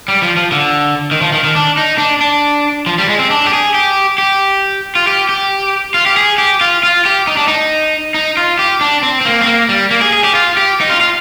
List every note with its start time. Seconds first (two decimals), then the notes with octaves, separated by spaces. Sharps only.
0.08 G3
0.22 F3
0.37 F3
0.52 D3
1.11 D#3
1.21 F3
1.33 D#3
1.44 D#3
1.55 D4
1.77 D#4
1.98 D4
2.21 D4
2.86 F3
2.98 G3
3.09 G#3
3.19 C4
3.31 D4
3.46 G4
3.53 G#4
3.74 G4
4.18 G4
4.95 F4
5.07 G4
5.29 G4
5.94 F4
6.06 G4
6.17 G#4
6.38 G4
6.61 F4
6.83 F4
7.05 G4
7.27 D#4
7.37 D4
7.48 D#4
8.14 D#4
8.37 F4
8.59 G4
8.81 D4
9.03 C4
9.21 C4
9.25 A#3
9.41 C4
9.46 A#3
9.69 G3
9.91 A#3
10.01 G#4
10.13 G#4
10.24 G4
10.35 F4
10.57 G4
10.81 D#4
10.90 F4
11.01 F4